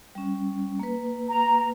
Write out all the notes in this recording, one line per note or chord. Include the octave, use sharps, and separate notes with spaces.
G3 C#4
A#3 B4
A#5